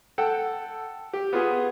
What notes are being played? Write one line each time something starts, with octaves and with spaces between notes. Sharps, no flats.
A4 F#5 G5
G4
B3 F4 G#4